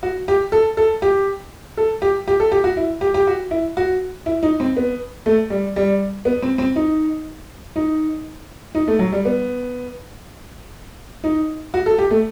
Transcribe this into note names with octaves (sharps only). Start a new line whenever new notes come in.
F#4
G4
A4
A4
G4
A4
G4
G4
A4
G4
F#4
E4
G4
G4
F#4
E4
F#4
E4
D#4
C4
B3
A3
G3
G3
B3
C4
C4
D#4
D#4
D#4
A3
F#3
G3
B3
D#4
F#4
A4
G4
A3